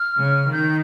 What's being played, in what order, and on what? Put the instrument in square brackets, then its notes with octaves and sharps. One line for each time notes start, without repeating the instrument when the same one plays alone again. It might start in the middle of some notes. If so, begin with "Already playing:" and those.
Already playing: [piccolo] F6
[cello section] C#3
[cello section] D#3 [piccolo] G6